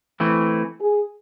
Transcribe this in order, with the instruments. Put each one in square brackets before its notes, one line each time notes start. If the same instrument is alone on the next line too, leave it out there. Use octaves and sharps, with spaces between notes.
[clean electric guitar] E3 A3 C4
[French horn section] G#4